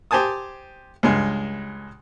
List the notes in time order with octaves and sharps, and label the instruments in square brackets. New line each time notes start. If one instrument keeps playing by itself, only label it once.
[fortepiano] G4 C5 G#5 A5 D#6
C#2 G2 G#3